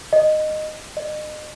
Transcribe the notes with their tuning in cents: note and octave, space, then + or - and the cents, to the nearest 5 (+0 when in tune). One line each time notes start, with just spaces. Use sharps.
D#5 -10
D#5 -35